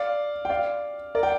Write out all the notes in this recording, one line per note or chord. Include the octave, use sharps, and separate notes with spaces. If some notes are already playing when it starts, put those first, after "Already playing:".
Already playing: D5 F5
G5
D5 F5
A#4 D5
G5